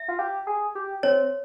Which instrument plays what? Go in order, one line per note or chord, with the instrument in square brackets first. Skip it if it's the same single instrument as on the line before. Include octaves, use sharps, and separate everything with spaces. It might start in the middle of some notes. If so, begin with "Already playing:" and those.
Already playing: [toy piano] E5
[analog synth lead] F4
G4
G#4
G4
[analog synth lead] C4 [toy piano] C#5